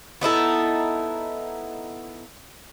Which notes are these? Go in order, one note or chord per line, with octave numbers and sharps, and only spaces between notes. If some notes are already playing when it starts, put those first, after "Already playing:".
B3 D#4 E4 A4